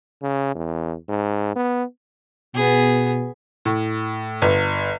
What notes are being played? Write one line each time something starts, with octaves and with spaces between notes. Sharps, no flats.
C#3
E2
G#2
B3
B2 B3 G#4
A2
G1